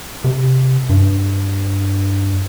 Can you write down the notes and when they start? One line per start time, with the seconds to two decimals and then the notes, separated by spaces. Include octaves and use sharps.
0.24 C3
0.89 G2